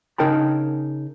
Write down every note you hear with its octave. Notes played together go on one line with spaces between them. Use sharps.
C#3 D#4 A#4 G5 A5 B5